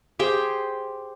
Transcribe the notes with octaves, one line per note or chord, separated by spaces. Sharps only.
G4 G#4 C5 G5